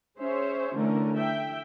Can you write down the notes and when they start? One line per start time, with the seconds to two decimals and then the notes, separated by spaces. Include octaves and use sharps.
0.19 C#4 G#4 C5 C#5 E5
0.75 D3 E3 A3 C#4 A#4
1.16 E5 G5